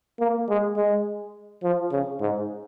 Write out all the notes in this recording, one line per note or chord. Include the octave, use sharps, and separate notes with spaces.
A#3
G#3
G#3
F3
C#3
G#2